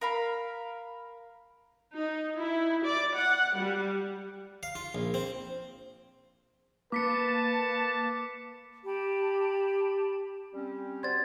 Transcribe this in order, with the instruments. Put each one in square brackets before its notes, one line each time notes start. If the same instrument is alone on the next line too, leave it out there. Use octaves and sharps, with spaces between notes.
[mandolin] A#4 F5 B5
[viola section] D#4
E4
D5
F#5
G3
[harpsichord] F5
F4
A#1
C4
[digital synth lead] A#3 [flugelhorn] B4 [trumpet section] A5 [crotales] D6 B6 C#7
[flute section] G4 A5 B5
[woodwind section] G3 C4 C#4
[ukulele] F#4 C5 D5 [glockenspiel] G#6 A6